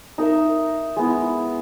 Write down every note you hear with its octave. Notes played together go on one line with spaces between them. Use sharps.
D#4 A#4 E5
G#3 B3 E4